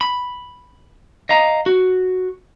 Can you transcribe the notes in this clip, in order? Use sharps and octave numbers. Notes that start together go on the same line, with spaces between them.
B5
D#5 F5 A#5
F#4